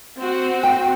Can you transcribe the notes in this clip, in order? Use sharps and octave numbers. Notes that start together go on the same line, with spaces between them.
C4 F#4
G5